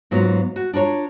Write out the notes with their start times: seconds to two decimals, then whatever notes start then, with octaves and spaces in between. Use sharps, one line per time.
0.11 G#2 F#3 B3 F4
0.56 F#4
0.73 D4 F4 A#4 C#5